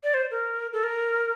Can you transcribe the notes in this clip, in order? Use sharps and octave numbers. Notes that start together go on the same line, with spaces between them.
D5
C5
A#4
A4
A#4